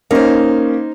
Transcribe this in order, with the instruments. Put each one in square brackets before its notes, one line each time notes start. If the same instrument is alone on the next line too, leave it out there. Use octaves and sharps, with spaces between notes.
[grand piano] A#3 C#4 [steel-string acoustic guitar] D#4 C5